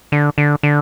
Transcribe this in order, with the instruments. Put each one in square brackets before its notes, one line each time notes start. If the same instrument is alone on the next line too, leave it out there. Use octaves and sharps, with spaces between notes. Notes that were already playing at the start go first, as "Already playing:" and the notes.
[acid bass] D3
D3
D3